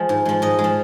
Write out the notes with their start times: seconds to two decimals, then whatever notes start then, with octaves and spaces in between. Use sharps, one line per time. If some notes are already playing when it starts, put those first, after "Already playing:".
Already playing: F3 G#3
0.09 G#2
0.25 F3 G#3
0.42 G#2 D#5
0.59 G#3
0.64 F3